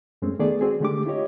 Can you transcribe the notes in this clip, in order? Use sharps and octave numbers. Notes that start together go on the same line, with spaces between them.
F#2 G#3 A3 C4 C#4
D#3 A3 B3 G#4 D5
G#3 C4 F#4 G#4
D3 G#3 A3 D4 G4 D6
E4 F4 G4 C#5 D#5